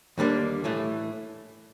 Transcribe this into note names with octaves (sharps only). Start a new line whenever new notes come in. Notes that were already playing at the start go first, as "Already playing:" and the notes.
D#2 D3 G3 A#3 D4
A2 E3 A3